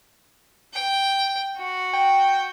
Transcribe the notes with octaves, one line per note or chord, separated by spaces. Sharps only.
G5
F#4
G5